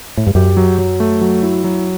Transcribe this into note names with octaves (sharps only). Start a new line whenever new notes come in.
A2
G2
F#2 G4
F#3
F#3
A3
F#3
E4
F#3